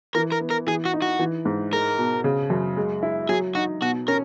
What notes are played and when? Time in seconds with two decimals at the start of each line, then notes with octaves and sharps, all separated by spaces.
0.15 E3 A#4
0.32 A#4
0.41 B3
0.51 A#4
0.67 E3 G#4
0.85 F#4
0.93 D#4
1.02 F#4
1.19 E3
1.45 G#2
1.73 G#3 A#4
1.98 B2
2.24 C#3
2.50 F#2
2.77 G#3
3.03 E4
3.29 F#3 G#4
3.55 D#4 F#4
3.81 B2 F#4
4.08 C#4 A#4